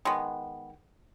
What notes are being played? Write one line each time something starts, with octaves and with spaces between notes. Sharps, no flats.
D#3 G#3 B3